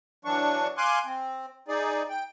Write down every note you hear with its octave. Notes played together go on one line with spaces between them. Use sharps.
E3 F#3 D4 C#6
F5 G#5 C6 D6 F#6
C4
D#4 G#4 D5
G5